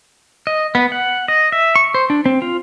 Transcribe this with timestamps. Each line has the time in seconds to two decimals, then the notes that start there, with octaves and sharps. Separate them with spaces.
0.47 D#5
0.75 B3
0.92 F#5
1.28 D#5
1.52 E5
1.76 C#6
1.94 C5
2.10 D4
2.26 C4
2.42 F4